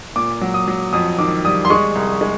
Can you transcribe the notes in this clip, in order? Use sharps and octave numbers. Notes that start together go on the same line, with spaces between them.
A#2 D6
F#3
D#6
F#3
F2 D#6
D#3 D6
G3 D#6
C6
G#3 C#6
C2
G#3